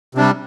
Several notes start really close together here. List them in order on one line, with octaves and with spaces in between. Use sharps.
C3 D4 G3